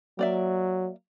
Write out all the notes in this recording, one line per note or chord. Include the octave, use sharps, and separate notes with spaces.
F#3 A#3 D5 E5